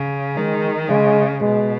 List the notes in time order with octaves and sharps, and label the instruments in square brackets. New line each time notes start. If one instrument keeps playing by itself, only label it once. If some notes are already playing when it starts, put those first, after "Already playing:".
Already playing: [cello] C#3
[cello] D#3 [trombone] G#3
[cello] C#3 [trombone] G#3
[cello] B2 [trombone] G#3